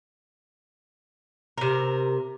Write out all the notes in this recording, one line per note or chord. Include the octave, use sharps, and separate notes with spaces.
C3 A#4